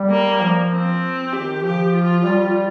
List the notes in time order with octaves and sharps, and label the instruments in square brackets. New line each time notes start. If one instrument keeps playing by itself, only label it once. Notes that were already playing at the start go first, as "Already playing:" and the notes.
Already playing: [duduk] G3
[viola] A#3
[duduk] F3
[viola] C4
[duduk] D#3 [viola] G4
[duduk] F3 [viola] G4
[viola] F4
[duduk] G3